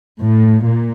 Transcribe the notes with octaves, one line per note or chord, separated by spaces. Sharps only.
A2
A#2